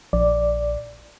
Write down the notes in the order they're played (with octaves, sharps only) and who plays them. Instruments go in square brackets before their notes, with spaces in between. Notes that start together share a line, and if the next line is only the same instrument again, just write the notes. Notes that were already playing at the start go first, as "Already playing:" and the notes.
[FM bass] A#1 [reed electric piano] D5